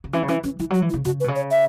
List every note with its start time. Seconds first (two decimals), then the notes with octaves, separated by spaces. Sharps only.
0.04 C#3
0.13 E3 C#4
0.23 C#3
0.28 E3 C#4
0.44 E3 C#4
0.60 E3 E4
0.70 F#3 F#4
0.82 E3
0.90 E4
0.94 C#3
1.05 C#3 F#4
1.20 B4
1.24 B2
1.28 C#3
1.36 C#5
1.51 E5